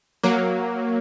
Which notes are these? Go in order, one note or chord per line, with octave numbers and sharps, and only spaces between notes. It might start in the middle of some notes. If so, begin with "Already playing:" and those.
F#3 A#3